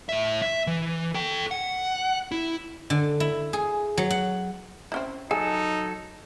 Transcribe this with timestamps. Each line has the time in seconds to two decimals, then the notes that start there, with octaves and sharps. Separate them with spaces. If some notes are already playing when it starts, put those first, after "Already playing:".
0.09 A2 E5
0.42 E5
0.67 E3
1.14 A4 G5
1.51 F#5
2.32 E4
2.90 D3
3.20 E4
3.53 G#4
3.97 F#3
4.10 F#5
4.92 C4 C#4 E4
5.31 F#3 D#4 G#4 A4 G#5